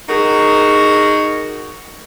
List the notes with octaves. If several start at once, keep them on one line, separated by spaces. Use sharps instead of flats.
D#4 F#4 G#4 A#4